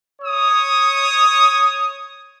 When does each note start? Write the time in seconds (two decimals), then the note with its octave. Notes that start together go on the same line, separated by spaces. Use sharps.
0.22 C#5 D#6